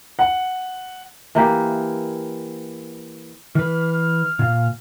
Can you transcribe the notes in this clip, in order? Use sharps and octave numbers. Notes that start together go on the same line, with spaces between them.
F#5
E3 A#3 G4
E3 B4 F6
A#2 F5